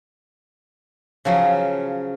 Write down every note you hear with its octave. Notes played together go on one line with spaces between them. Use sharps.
C#3 F3 F#3